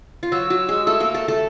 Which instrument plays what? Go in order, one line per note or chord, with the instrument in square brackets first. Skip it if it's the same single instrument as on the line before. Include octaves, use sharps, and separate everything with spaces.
[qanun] F4
[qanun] F#3 F#4 [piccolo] E6
[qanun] F#3 F#4
G#3 G#4
A3 A4
A#3 A#4
A3 A4
A3 A4